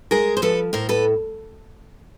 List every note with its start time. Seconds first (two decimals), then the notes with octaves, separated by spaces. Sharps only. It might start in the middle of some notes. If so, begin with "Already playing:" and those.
0.11 G#3 G#4 A#4
0.37 C5
0.42 F3 A4 B4
0.73 A2 A#4 C5
0.89 A4 B4